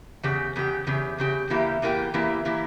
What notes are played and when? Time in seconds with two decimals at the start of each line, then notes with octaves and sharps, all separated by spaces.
0.23 E2 C#3 G4
0.56 E2 C#3 G4
0.87 E2 C#3 G4
1.18 E2 C#3 G4
1.50 E2 E3 A#3 E4 G4
1.82 E2 E3 A#3 E4 G4
2.14 E2 E3 A#3 E4 G4
2.45 E3 A#3 E4 G4